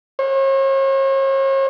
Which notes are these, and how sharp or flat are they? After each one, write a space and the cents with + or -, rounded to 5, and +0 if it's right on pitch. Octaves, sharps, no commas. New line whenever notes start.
C#5 -45